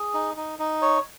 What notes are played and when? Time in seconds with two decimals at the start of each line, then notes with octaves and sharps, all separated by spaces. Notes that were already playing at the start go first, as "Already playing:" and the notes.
Already playing: G#4
0.14 D#4
0.37 D#4
0.59 D#4
0.82 C#5